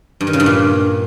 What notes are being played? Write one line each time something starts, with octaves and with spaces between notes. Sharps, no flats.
G2
D#3
C#3
G2
A#2